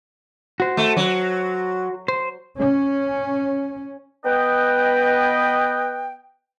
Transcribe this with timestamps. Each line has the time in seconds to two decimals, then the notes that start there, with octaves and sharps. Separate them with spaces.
0.60 F#4 C5
0.77 A3
0.97 F#3
2.08 C5
2.58 C#4
4.25 B3 B4 D#5 G5